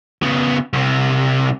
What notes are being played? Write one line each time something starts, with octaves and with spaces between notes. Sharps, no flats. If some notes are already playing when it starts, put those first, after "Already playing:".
C#3 B3
C2 C3